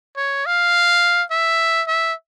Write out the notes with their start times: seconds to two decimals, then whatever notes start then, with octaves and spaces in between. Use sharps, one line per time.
0.17 C#5
0.46 F5
1.31 E5
1.88 E5